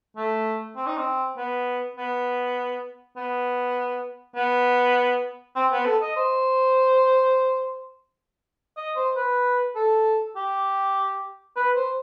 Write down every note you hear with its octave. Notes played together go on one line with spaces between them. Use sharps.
A3
C4
D#4
C4
B3
B3
B3
B3
C4
B3
A4
D#5
C5
D#5
C5
B4
A4
G4
B4
C5